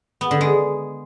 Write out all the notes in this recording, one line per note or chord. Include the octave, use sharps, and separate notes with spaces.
B3
D3
G#3